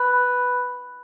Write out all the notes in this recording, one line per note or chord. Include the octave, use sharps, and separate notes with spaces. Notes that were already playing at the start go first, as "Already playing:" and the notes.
Already playing: B4